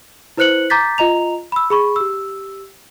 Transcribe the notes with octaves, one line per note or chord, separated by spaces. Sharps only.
E4 B4 C5 F#6 C#7 F#7
A#5 D6 G6 A6 B6
F4 D#5 A#5 F7
B5 E6
G#4 B5 C#6
G4 E6